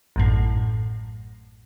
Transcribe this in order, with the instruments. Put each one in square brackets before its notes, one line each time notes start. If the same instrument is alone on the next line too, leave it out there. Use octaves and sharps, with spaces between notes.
[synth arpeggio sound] A1 F#2 A2